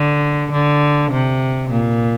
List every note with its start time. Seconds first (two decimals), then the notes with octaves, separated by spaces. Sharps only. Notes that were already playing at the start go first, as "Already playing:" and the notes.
Already playing: D3
0.52 D3
1.12 C3
1.71 A#2